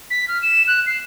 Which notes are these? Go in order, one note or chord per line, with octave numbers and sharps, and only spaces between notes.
B6
F6
E7
F#6
C7